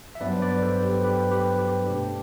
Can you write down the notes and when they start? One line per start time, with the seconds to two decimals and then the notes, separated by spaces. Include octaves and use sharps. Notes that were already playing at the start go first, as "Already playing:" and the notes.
0.15 E5
0.21 G2 F#3 B3 D4 B4 D5
0.33 C5
0.41 B4 D5
0.62 A4 C5
0.83 G4 B4
1.04 G4 B4
1.31 G4 B4
1.59 G4
1.86 B2 A3 D4 G4